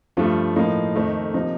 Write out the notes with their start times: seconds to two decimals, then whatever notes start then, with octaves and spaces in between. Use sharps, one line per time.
0.17 G2 F3 A3 F4
0.56 A2 F3 A#3 D#4
0.96 F2 D#3 A3
1.34 C3 F3 A#3 D#4